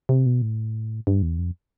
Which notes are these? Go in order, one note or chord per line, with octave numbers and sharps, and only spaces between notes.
C3
B2
A2
G2
E2
F2